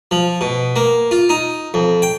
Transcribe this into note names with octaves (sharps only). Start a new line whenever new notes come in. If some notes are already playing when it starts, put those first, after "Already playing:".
F3
B2
A#3
F4
D#4
F2
G5